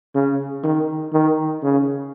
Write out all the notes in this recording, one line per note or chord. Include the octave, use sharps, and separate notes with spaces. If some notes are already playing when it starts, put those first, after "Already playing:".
C#3
D#3
D#3
C#3